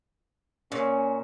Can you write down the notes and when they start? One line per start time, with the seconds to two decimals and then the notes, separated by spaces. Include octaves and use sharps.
0.72 A#2 C#4